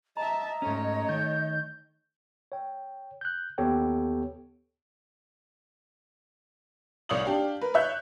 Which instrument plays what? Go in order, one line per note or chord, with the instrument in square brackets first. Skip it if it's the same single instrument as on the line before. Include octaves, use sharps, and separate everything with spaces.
[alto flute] D#5 [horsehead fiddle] E5 A5 [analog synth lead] A#5
[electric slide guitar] G#2 C#4 [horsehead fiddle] A3 C#5
[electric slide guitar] D#3 [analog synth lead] G6
[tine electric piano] C#5 G5
F#6 G6
D#2 B3 G4 A4 C#5 G5
[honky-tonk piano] C2 C#5 D5 F5 D#6 F#7
D4 G4 F5
A#4 B4
C#5 E5 F#6 G6